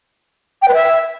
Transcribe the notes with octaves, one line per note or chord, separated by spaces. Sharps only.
G5
B4
E5